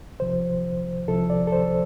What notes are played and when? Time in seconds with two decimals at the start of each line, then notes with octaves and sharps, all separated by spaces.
0.20 C2 C3 F3 C5
1.08 C2 C3 F3 A4
1.30 D5
1.47 A4
1.52 C5